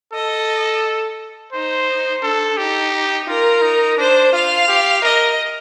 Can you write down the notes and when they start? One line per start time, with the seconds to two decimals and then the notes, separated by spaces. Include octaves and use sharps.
0.12 A4 D#5
1.52 D#4 C5
2.22 D4 A4
2.57 D#4 G4
3.27 F4 A#4
3.62 D#4
3.97 D4 C5
4.33 F4 F5
4.68 G4
5.02 A#4 D#5